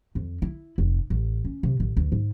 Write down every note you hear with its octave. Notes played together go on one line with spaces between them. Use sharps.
F2
E4
F1
A1
C#4
C3
A1
D2
G#2